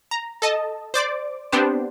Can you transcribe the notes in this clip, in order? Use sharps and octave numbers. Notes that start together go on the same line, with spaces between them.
A#5
A4 D#5 A5
C5 D5 D6
B3 C4 D4 G4 C5